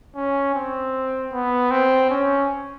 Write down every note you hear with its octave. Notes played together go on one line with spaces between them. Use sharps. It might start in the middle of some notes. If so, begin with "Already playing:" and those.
C#4
C4
B3
C4
C#4